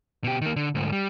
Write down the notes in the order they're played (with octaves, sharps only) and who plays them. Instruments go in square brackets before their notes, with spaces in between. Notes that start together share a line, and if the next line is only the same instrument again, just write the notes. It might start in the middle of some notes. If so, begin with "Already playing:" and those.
[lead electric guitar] B2 G4
D#3 A#3
D3
D2 G#2
G3